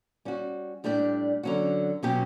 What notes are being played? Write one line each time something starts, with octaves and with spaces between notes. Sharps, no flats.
G3 C#4 F#4
A2 G3 D4 G4 D5
D3 F#3 C#4 F#4
B2 F#3 C#4 G4